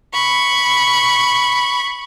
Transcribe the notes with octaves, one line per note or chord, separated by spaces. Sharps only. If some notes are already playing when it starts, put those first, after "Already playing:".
B5 C#6